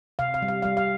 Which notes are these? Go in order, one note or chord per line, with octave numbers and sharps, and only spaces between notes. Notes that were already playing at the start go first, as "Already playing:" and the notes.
C3 F5
F5
G3
F5
G3 F5
F5